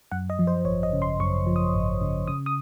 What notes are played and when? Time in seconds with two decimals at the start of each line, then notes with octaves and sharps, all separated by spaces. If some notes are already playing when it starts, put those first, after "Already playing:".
0.12 F#2 F#5
0.30 D#5
0.39 F3
0.47 C5
0.65 G#1 C#5
0.83 D#5
0.93 C#3
1.02 C6
1.20 F#2 C#6
1.47 F3
1.56 D#6
1.74 G#1
2.01 C#3
2.27 C#3 D#6
2.46 D#6